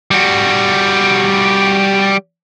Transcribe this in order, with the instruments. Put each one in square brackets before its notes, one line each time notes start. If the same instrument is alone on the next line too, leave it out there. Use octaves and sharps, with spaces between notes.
[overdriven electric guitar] G3 F#4